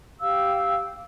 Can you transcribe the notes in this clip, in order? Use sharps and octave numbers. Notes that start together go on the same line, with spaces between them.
G4 F5 E6